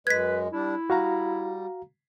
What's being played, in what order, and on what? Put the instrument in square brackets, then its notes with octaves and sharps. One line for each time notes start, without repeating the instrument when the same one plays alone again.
[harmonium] F#2 G#3 [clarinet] B4 [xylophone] G#6 B6
[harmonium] G3 D4 [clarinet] E4
[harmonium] G3 [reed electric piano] F#4 F5 A#5